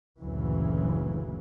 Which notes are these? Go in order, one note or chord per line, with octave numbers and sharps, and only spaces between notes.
F#1 D2 A#2 C#3 E3 F#3